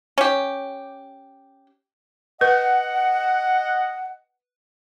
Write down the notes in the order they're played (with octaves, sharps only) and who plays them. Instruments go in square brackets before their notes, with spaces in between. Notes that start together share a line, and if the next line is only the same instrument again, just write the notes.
[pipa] C#4 G4
[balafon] B4 [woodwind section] D#5 F#5